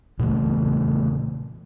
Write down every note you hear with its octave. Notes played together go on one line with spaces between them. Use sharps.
A#2 C#3 E3 A3